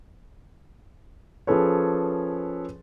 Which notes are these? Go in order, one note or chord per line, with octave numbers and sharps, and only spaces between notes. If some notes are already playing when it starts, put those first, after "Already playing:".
F3 C#4 G#4 A4 B4 C#5